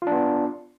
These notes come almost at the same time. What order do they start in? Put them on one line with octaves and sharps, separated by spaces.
F4 D4 B3